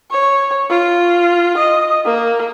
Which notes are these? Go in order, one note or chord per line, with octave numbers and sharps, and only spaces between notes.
C#5
F4
D#5
A#3